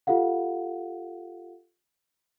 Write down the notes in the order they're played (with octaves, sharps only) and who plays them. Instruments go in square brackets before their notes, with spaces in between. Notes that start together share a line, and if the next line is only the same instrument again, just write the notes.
[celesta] F4 G4 A4 F5 F#5